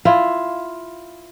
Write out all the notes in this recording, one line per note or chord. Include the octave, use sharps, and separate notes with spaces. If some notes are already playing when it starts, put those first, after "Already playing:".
E4 F4